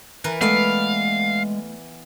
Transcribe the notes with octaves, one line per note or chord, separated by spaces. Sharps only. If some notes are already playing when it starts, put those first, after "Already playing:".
E3 A#4 B4
G#3 A3 B3 D5 E5 F5 F6